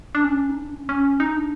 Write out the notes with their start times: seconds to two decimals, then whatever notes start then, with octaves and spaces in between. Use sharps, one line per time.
0.15 D4
0.24 C#4
0.49 D#4
0.57 D4
0.73 C#4
0.89 C#4
1.20 D#4
1.36 D4